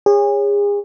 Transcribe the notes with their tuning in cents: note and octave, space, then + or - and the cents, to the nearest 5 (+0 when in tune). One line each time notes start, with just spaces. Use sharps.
G#4 -35 C#5 +0